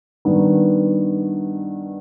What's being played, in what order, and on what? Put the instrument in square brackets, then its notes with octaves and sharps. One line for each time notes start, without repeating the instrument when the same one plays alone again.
[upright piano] G2 D#3 B3